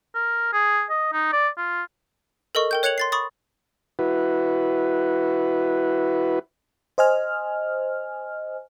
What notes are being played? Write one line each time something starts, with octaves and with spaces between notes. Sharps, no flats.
A#4
G#4
D#5
D#4
D5
F4
A4 A#4 D#5 C#6
A#4 G5 G6
C#5 F#6 G#6 C#7 F7 F#7
C6 A6 C7
B5 C#6 D#6 A6
E4 F#4 B4
C5 D#5 G#5 F6